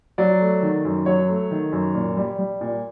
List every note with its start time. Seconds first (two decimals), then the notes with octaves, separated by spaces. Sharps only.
0.18 F#3 D5
0.41 A3
0.63 D#3
0.85 F#2
1.06 F#3 C#5
1.29 A3
1.51 D#3
1.72 F#2
1.95 A#2
2.17 G3
2.39 G3
2.61 A#2